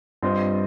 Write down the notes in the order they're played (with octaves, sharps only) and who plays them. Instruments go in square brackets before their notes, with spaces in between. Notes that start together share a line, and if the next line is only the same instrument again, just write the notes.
[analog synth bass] G2 [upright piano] C4 F4 C5 D#5